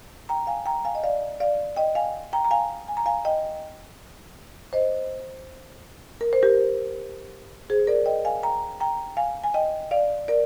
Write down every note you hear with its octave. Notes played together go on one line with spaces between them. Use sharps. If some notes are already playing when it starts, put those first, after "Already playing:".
G5 A#5
F5 G#5
G5 A#5
F5 G#5
D#5
D5 F5
D5 F5
D#5 G5
F5 G#5
G5 A#5
A#5
F5 G#5
G#5
A#5
F5 G#5
D#5 G5
C5 D#5
A#4
C5
G4 A#4
G#4 C5
A#4 D5
D#5 G5
F5 G#5
G5 A#5
G5 A#5
F5 G#5
G#5
D#5 G5
D5 F5
A#4 D5